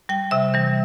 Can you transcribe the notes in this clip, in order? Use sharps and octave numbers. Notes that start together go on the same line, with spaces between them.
G3 G5
C3 E5
E3 G3